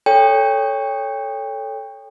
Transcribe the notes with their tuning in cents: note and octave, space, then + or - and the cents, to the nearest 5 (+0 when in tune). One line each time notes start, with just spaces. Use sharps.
A4 +0 C#5 +5 G5 +30